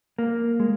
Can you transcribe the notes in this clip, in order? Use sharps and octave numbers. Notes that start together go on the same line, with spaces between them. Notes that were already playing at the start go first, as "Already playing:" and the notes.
A#3
G#3